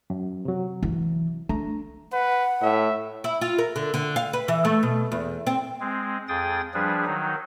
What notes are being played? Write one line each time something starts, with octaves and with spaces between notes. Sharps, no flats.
F#2
C3 F#3
E3
A3 D4 A#5
B4 F#5
A2 E5
E4
F4
A#4
D3
D3
F5
B4
E3
A3
B2
E2
C4
G#3 C4
F2 G#4 G5 D#6 A6
F3 G3 D4 G#4 B4
D#3 F#3 D#4